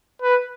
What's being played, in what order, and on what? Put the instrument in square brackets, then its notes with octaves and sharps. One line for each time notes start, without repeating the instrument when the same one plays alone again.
[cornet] B4